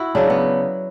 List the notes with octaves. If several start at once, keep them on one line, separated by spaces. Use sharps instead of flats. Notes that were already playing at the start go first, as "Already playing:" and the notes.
Already playing: E4 F#4
C#3 F#3 D4
B3